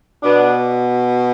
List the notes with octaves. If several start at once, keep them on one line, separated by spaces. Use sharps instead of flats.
B2 B3 D4